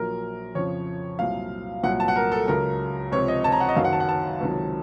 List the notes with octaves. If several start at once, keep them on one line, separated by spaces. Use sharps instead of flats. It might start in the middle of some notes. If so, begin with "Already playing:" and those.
Already playing: A#1 A#2 F#3 A#4
F2 C#3 F3 C#5
C2 A#2 F#3 F5
C2 A#2 F#3 F#5
A5
F#5
A#4
A4
C#2 C#3 F#3 A#4
C#2 C3 F3 C#5
D#5
A5
A#5
F#5
D#5
F#1 F#2 D#3 F#3 F5
F#5
A5
F#5
A5
C#2 C3 D#3 F#3